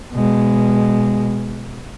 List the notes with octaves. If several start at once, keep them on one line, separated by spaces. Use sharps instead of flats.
B2 G#3